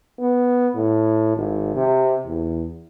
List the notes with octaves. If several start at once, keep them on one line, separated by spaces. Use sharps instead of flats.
B3
A2
G#1
C3
E2